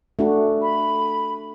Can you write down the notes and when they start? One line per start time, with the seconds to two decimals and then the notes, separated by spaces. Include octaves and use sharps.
0.19 A3 D4 F#4
0.61 B5